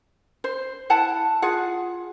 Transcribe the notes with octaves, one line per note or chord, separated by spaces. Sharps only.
C5
E4 F#5 A5
F4 G#4 F#5